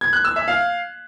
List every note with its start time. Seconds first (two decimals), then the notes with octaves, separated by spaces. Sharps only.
0.01 G#6
0.13 F#6
0.24 E6
0.36 E5
0.48 F5